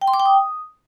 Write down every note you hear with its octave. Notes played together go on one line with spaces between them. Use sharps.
G5
C6
D6
G5
D#6